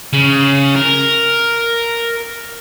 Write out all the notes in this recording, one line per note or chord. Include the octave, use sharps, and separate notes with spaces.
C#3
A#4